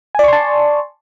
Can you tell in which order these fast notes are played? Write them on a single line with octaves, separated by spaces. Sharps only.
G#5 D5 C#6 C6 A5